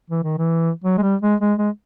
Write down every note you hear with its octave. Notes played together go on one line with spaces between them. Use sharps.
E3
D#3
E3
F#3
G#3
G3
G#3
G#3
G#3